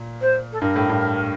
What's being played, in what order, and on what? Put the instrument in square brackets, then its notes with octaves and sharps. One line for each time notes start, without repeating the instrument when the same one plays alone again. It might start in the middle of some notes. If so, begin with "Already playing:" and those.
Already playing: [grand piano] A#2
[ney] C5
A4
[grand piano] G2 [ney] A#4
[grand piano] A2
G2